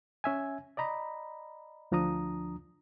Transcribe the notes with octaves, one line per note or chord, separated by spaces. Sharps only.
C#4 E5 G#5
D5 D#5 A#5 B5
D2 F3 D4 A#5 D#6